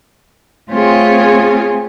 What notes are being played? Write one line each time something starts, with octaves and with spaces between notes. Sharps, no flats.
A3 C4 F4 G#4 C#5 G#5